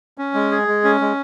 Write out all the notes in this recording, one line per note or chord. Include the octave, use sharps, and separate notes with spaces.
C#4
G#3
G#4
G#3
C#4
G#3